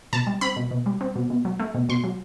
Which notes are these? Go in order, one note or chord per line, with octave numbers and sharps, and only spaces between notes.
B2 A5
G3
C4 B5
B2
B2
G3
C4
B2
B2
F#3
A3
B2
B2 C6
F#3